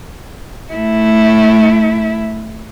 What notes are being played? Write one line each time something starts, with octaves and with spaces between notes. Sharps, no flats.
A3 E4